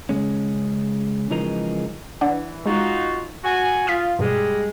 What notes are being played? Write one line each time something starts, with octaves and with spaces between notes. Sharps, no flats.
C#3 G#3 C#4
C#3 E3 F3 G#3 D#4 A#4
E3 D4 D5 F#5
G#3 D#4 F4 F#4
F#4 G#5
F4 D#6 F6 B6
G2 B2 G3 G#3